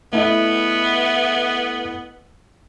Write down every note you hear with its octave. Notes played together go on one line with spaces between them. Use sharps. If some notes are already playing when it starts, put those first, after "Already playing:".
A3 B3 E4 D#5